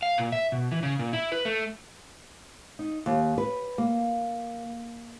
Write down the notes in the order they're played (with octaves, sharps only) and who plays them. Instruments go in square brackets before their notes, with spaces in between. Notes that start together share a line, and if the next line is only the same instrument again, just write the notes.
[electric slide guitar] F5
A#2
E5
B2
E3
C#3
A#2
E4
B4
A3
[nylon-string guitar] D#4
D#2
B4
A#3